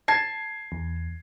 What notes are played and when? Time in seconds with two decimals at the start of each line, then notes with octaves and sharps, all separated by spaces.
0.08 A5 G#6 C7
0.72 E2